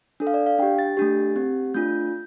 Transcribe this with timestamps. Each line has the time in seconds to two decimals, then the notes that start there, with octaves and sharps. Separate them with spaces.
0.20 D4 A4
0.27 F5
0.34 D5
0.46 F5
0.58 D4 G4 G5
0.79 A6
0.97 A3 D4 G4
1.36 C4 G4
1.74 A3 D4 F4 G6